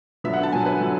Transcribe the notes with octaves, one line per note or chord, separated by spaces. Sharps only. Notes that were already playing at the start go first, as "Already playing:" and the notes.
D3 F#3 B3 E5
F#5
A5
D3 F#3 B3 G#5
B4
D3 F#3